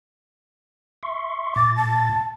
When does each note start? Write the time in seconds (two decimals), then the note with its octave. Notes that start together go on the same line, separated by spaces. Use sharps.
1.03 E5 C6 C#6
1.56 A#2 D6 A6
1.76 A5